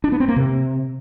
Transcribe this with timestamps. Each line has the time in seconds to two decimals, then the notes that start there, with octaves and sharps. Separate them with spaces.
0.04 D4
0.12 B3
0.20 C4
0.28 A#3
0.36 C3